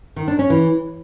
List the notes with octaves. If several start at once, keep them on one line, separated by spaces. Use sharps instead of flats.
D#3
D4
C#4
E3